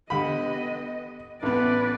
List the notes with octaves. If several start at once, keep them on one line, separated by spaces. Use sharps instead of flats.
D3 B3 G4 D#5 B5
A1 B3 B4 D5